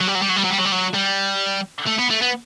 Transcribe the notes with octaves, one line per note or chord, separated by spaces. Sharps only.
F#3
G3
F#3
G3
F#3
G3
F#3
G3
F#3
G3
F#3
G3
A3
B3
A3
B3